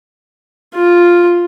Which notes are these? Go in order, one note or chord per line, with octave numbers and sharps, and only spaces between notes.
F4